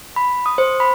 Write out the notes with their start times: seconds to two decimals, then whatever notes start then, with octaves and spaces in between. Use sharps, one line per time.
0.16 B5
0.46 D#6
0.58 C5
0.80 B5